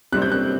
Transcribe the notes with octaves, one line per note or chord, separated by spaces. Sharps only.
C3 G3 C4 F#6
G6
F#6